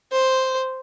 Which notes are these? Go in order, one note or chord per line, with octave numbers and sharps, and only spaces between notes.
C5